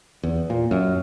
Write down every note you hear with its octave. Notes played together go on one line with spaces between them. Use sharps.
E2
A#2
F#2